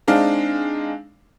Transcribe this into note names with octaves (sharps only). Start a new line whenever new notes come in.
G#3 C4 D4 D#4 F5